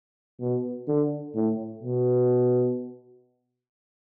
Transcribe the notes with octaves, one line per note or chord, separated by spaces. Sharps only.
B2
D3
A2
B2